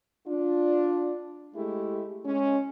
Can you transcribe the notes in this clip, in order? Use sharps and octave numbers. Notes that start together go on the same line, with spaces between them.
D4 F4
G#3 A3 E4 G4
G#3 C#4